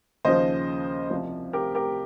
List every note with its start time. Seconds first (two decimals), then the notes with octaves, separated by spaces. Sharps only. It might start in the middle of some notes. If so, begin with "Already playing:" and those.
0.25 D#2 C#3 F3 C5 D#5
1.10 C2 C3 F3
1.53 G4 A#4
1.75 G4 A#4